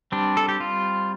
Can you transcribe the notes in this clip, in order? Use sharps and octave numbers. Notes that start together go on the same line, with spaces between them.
G3 C4 D4
A4
G4
F4